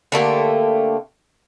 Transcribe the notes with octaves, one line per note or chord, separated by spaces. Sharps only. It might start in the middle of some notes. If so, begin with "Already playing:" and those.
D3 A3 A#3 G4